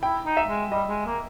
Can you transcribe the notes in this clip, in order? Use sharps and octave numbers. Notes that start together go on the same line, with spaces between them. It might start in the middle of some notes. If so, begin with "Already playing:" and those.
E4 G5
D#4
E5
G#3
G3 D#5
G#3
A#3